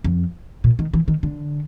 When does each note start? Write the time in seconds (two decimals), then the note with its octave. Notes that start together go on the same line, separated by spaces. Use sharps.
0.04 F2
0.64 A#2
0.79 D#3
0.94 E3
1.08 D#3
1.23 D3